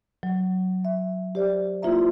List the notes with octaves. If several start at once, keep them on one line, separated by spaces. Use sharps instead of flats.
F#3
E5
G4 C5 D5
A#3 E4 F4 C5 E5 A#5